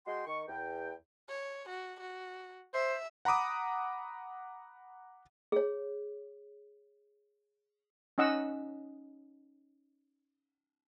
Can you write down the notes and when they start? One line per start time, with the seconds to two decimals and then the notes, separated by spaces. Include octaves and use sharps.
0.07 G#3 F#4 G#4 G5 C6
0.27 D#3 C#6
0.49 E2 G5
1.29 C#5
1.70 F#4
2.00 F#4
2.74 C5 E5
3.25 F#5 A#5 B5 D6 D#6
5.52 G#4 C#5
8.18 C#4 D#4 D#5 F#5 E6